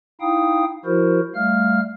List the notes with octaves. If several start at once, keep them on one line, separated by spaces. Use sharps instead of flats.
D#4 E4 F5 G5 D#6
F3 E4 F#4 A#4 C5
G3 A3 F5 F6